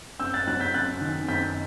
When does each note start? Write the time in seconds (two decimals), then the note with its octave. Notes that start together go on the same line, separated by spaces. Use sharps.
0.20 F#2 E6 G6
0.34 F#6 A6
0.47 F#3 F#6 A6
0.60 G6 B6
0.74 F#2 F#6 A6
1.01 D#3
1.28 F#2 G6 B6